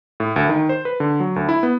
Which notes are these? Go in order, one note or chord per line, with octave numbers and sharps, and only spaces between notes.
A2
D2
D#3
C5
B4
D3
F#3
D2
E4
B3